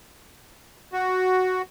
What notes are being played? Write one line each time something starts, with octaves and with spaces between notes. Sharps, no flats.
F#4